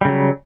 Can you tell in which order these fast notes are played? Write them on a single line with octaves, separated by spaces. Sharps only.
G3 C#3 F#3